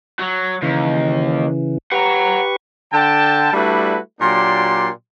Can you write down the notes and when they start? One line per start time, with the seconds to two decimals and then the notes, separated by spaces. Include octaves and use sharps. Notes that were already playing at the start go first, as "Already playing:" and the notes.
0.19 F#3
0.62 D#2 C#3 E3
1.92 G4 B4 F#5 A#5 C#6
2.93 D3 G5 A5
3.53 G3 A3 D4 E4 F#4 B4
4.20 A#2 F#3 A#3 D4 G4 C6